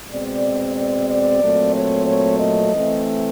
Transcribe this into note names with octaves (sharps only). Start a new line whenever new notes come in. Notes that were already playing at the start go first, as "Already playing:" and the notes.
B2 G#3 C4 D5
D5
D5
A#2 F#3 A3 C4
C#5
C#5
D#5
E3 A3 C4